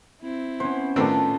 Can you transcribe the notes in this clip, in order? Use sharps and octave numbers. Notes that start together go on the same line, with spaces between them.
C4 E4
B3 C#4 C5
A2 D#3 A3 C4 D4 F4 A4 B4